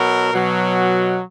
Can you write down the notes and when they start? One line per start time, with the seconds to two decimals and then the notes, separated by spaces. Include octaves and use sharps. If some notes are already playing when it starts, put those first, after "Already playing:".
Already playing: B2 F#3 A#4
0.33 B2 F#3